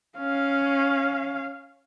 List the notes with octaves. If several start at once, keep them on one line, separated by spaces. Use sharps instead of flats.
C#4 F5